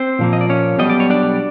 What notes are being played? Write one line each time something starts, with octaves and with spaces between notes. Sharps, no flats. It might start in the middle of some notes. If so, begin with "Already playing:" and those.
Already playing: C4 C5
A#2 F3 A#3
D#5
D5
C#4 C#5
B1 B2 G3 D#5
D5
C#5
D4 D5